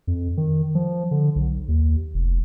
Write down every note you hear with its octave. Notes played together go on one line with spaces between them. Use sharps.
F2
D#3
F3
D3
B1
D#2
F1